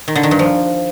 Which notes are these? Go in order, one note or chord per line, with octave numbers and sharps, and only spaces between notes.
D#3
D3
D#3
G2
F3